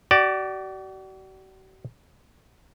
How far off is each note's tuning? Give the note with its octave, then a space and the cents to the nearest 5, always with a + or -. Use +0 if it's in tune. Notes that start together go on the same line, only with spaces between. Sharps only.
F#4 +45 D5 +0